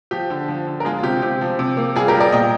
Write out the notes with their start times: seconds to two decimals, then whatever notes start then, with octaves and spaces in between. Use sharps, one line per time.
0.11 F3 G4
0.30 D3
0.48 F3
0.67 D3
0.80 A#4
0.85 G#3 F4 G#4
0.99 F4
1.03 C3 G4
1.22 C3 G4
1.41 F3
1.59 C3
1.77 A#3
1.96 G3 F4 G#4
2.08 G4 A#4
2.15 G3
2.20 A#4 D5
2.32 A#2 D#5 G5